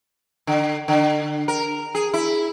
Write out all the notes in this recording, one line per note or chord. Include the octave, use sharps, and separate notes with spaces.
D3
D3
A#4
G#4
E4